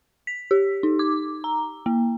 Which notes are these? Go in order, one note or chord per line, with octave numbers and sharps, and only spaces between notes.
B6
G4
D#4
D6
A#5
A#3